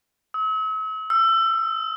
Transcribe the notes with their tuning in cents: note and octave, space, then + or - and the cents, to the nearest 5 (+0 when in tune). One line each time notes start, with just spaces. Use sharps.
E6 -45
E6 +25